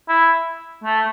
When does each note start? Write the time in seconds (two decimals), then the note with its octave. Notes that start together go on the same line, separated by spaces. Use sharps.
0.09 E4
0.84 A3